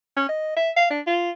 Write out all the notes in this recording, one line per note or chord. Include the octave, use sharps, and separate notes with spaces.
C#4
D#5
E5
F5
D4
F4